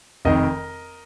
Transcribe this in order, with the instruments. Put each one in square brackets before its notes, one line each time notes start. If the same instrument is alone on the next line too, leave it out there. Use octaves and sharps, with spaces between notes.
[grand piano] F1 F2 D#3 A#4 D#5